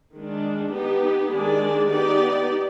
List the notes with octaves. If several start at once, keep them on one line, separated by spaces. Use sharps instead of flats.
D#3 G#3 D4
B3 D#4 G4
D#3 G#3 D4 G#4 D5
B3 D#4 G4 D5